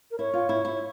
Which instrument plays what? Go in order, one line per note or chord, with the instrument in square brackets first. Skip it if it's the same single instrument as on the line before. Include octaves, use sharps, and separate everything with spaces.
[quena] A#4
[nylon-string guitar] E4 [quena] C#5
[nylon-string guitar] F4
E4
E4